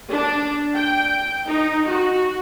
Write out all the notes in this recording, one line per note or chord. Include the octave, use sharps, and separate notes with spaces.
D4
G5
D#4
F#4